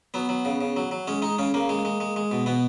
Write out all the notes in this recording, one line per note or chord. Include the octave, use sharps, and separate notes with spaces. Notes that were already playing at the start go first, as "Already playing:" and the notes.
F#3 B3
F#3
C#3
C#3
F#3
F#3
G#3 C#4
G#3 D#4
C#3 C#4
C#3 A#3
G#3
G#3
G#3
G#3
B2
B2 B3